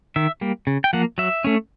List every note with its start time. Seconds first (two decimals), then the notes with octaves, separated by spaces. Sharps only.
0.16 D#3 E5
0.41 G3 A#3
0.67 C#3
0.84 G5
0.93 F3 A#3 F#5
1.18 F#3 E5
1.44 A3 C#4